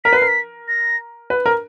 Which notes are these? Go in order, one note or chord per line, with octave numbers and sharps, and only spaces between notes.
A#4 B6
B4
A#4 C7
B6
A#6
B4
A#4